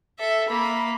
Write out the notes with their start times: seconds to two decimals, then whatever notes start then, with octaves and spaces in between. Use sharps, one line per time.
0.19 A4 E5
0.49 A#3 B5